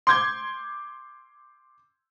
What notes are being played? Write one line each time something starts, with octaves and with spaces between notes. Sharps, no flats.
C6 D6 G6 G#6